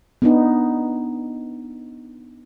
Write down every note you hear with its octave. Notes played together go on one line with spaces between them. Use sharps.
B3 D4 D#4